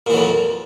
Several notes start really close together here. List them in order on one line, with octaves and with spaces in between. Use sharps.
A#2 E3 F#3 F2